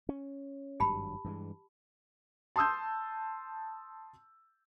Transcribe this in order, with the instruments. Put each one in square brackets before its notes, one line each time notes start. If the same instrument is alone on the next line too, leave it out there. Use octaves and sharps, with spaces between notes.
[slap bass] C#4
[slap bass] G#1 G2 F#3 [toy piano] G4 A5 B5
[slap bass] G2 E3 G#3
[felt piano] A5 C6 D#6 E6 G6